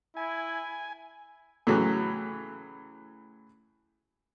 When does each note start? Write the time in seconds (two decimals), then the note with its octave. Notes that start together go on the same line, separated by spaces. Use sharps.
0.17 E4 G#5
1.67 A2 C#3 E3 F#3